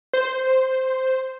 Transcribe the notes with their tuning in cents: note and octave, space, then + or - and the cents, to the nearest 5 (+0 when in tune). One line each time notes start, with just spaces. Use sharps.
C5 -5